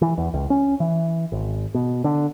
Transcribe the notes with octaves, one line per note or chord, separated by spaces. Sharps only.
E3
E2
C#2
C#4
E3
G#1
B2
D3